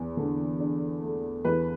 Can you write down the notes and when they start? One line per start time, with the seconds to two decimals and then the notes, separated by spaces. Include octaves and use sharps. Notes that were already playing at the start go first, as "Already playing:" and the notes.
Already playing: E2
0.17 D3
0.60 D4
1.02 A3
1.45 E2 B4